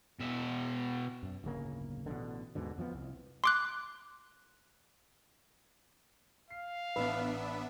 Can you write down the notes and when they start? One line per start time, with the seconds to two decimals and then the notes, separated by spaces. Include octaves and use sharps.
0.20 B2 E5
1.23 F#2
1.44 D1 G1 C#3 A#3
2.06 A1 B2 D3
2.55 D#2 G#2 B2 D3
2.78 F2 F3 F#3 B3
2.94 C2
3.44 C6 D6 F#6
6.50 F5 C7
6.96 A1 B3 D4 B4 D#5 E5 B5